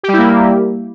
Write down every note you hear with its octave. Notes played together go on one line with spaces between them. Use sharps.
G3 A#3 E4 G4